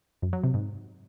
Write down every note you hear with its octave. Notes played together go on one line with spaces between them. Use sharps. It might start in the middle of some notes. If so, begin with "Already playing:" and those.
F#2
F#3
C3
G#2